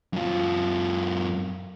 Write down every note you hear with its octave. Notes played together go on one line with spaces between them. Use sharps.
F#2 F4